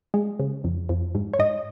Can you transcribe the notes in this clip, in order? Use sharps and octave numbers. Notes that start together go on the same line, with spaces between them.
G#3
C#3
F2
F2
G#2
C#5
G#2 D#5